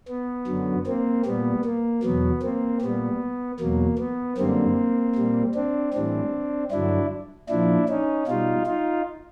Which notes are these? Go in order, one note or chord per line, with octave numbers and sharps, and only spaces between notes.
B3
F#2 D3 F#3
A#3 C4
A#2 G3 B3
A#3
E2 B2 F#3 B3
A#3 C4
A#2 G3 B3
E2 B2 F#3 A#3
B3
F#2 D3 G3 A#3 C4
A#2 G3
C4 D4
A2 E3 G3 C4 D4
G2 D3 F#3 D4 E4
A#2 F3 D4 E4
C#4 D#4
B2 G3 D#4 F4
D#4 F4